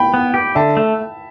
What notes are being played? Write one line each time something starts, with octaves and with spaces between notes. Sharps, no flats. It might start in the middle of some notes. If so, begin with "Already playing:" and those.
Already playing: G5 B5
B3
G4
D3 E5 A5
A3